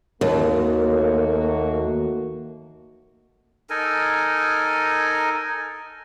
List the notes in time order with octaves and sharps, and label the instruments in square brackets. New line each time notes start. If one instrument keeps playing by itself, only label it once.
[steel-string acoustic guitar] D#2 [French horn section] A3 A#3 F#4
[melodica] D#4 A4 A#4 G#5